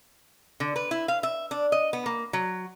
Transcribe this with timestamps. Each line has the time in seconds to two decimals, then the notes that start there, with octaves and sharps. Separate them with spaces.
0.60 D3
0.76 B4
0.91 E4
1.08 F5
1.23 E5
1.51 D4
1.72 D#5
1.93 B3
2.06 A#3
2.33 F#3